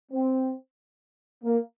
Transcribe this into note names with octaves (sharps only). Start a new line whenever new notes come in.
C4
A#3